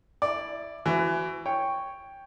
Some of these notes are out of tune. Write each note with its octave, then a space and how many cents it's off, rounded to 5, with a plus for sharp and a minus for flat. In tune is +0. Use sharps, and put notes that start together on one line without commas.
E4 +0 D5 +5
E3 +25 F#4 +15
C#5 +0 G5 +5